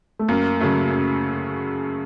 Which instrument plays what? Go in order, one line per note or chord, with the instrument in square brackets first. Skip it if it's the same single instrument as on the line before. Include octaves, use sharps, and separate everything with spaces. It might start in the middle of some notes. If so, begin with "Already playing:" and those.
[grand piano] A3
[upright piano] F#2 [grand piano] A#3
[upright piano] C#3 F#3 A3
F#2